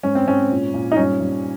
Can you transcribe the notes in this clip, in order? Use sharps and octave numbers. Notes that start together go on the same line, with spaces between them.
G#2 C#4
C4
G#2 C#4
A#2
A#2
D#4
G2 C#4
G2